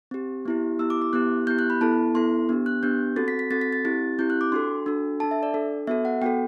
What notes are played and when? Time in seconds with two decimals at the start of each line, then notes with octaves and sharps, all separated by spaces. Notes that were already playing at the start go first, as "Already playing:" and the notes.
0.11 C4 G4
0.45 B3 E4 G4
0.79 B3 E4 G4 E6
0.90 D6
1.02 D6
1.13 B3 E4 G4 F#6
1.47 B3 E4 G4 G6
1.59 F#6
1.70 B5
1.81 B3 E4 A4 A5
2.15 B3 E4 A4 C6
2.49 B3 D4 G4
2.66 F#6
2.83 B3 D4 G4 G6
3.16 C4 F#4 A4 A6
3.28 B6
3.39 B6
3.51 C4 F#4 A4 A6
3.61 B6
3.73 A6
3.85 C4 E4 G4 A6
4.18 C4 E4 G4 G6
4.30 F#6
4.41 D6
4.52 D4 F#4 A4 C6
4.86 D4 F#4 A4
5.20 A4 A5
5.24 D4
5.31 E5
5.43 D5
5.54 D4 A4
5.87 B3 F#4 A4 E5
6.05 F#5
6.22 B3 F#4 A4 G5